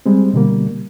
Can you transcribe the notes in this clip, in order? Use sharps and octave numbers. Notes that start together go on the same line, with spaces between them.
G3 G#3 C4
B2 D3 G3 A#3